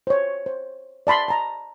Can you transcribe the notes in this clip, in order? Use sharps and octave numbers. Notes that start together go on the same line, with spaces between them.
C5 C#5
C5
D5 A5 B5 C6
A5 A#5